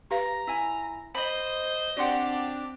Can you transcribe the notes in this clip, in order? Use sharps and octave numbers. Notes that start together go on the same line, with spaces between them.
G4 B4 F5 A#5
E4 G#5
C5 D#5 B5
C4 D4 F#4 G4 D5 F#5 C6